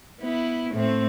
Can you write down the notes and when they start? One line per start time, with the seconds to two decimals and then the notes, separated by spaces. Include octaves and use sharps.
0.20 B3 E4
0.73 A2 A3 C4